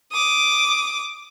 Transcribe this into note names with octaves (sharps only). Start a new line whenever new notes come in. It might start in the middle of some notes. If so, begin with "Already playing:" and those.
D6 D#6